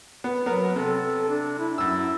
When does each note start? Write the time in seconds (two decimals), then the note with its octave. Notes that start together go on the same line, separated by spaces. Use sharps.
0.24 B3
0.46 F#3 B3 A#4
0.76 C3 A4
1.29 D4
1.59 E4
1.78 F#2 E4 E6